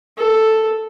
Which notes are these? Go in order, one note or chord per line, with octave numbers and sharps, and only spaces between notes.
A4